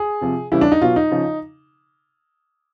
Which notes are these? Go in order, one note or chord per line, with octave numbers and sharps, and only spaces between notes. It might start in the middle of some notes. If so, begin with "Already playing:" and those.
Already playing: G#4
C3 F3
C#3 E3 G3 E4
D4
D#4
B2 F#3 F4
D#4
C#3 F3